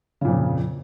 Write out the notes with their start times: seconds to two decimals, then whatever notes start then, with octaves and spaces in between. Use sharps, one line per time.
0.21 C#3
0.25 A#2
0.28 F2